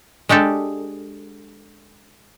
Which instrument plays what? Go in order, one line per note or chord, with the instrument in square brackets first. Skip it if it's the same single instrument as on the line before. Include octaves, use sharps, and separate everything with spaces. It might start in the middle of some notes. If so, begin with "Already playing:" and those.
[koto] G#3 D4 G4 A4